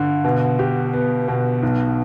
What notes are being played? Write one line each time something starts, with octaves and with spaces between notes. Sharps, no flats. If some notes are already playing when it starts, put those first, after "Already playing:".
Already playing: G2 D3
B2
G4
B3
B2
B1